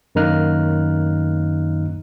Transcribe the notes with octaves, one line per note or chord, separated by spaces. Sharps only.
F#2 D#3 A#3 D#4 F6 F#6